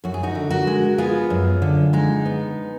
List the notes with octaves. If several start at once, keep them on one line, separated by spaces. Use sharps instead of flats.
F#2 F#4
G#4
D#4 F#4
D3
F#4 A#4
G#3
B3 F4 G#4
F#2
D3
G#3 D#4
B3